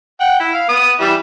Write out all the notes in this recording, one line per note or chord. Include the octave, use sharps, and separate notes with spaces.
F#5 G5
E4
F5
B3 D#6
E3 G3 E5